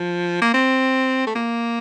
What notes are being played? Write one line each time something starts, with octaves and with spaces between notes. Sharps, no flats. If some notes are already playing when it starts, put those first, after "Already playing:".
Already playing: F3
A#3
C4
A3
A#3